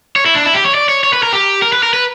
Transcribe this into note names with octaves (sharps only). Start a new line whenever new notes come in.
C#5
E4
D4
E4
G4
C#5
D5
C#5
C#5
B4
A#4
G4
A#4
B4
A#4
B4